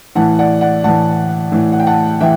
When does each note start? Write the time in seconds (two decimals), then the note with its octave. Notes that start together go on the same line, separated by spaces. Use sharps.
0.15 A2 E3 F#5 A5
0.39 D5 F#5
0.61 D5 F#5
0.84 A2 E3 F#5 A5
1.52 A2 E3
1.72 F#5
1.80 G5
1.87 F#5 A5
2.21 E3 E5 G5